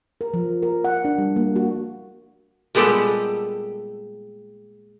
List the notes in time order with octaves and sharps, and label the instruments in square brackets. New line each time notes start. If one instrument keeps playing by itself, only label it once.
[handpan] A#4
F3
A#4
F#5
D4
G3
A#3
F#4
[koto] A#2 G3 G#3 B3 G4 A4